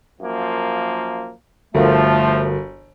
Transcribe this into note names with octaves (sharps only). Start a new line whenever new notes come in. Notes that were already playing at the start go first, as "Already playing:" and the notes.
F#2 F3 A#3
G1 F3 A3 F#4 A4 A#4